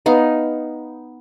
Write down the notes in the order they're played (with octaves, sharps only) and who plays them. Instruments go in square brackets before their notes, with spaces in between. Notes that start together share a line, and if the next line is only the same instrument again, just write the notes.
[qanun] B3 D#4 F5